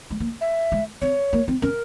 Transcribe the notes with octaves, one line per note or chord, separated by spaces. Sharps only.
G#3
A#3
E5
G#3
C4 C#5
A#3
C4
C#4 A#4